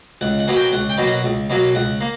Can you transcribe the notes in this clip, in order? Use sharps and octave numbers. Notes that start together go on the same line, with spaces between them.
C#2 F#5
F#5
B2 F#3 A#3
G5
C#2 F#5
G5
B2 F#3 A#3
F#5
C#2
B2 F#3 A#3
C#2 F#5
A#3